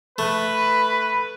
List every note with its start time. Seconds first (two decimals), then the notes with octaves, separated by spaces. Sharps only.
0.18 A3 B4 B5